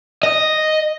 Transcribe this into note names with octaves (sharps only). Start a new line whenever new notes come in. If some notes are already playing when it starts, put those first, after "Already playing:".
D#5